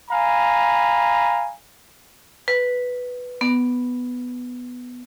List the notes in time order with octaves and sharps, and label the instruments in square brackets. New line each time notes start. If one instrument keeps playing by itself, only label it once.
[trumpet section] F5 G#5 A#5 B5
[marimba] B4
B3